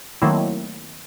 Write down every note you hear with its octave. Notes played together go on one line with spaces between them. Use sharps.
D#3 F#3 A3 A#3 C4 E4